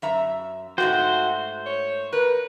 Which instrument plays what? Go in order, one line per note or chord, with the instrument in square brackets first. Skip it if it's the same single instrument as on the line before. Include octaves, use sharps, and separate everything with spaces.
[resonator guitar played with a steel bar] F#2 E5 A#5
[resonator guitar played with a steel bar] G#2 A3 G5 [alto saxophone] F#4 [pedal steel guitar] C5
[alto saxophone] C#5
[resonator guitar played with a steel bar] A#4 [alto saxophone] B4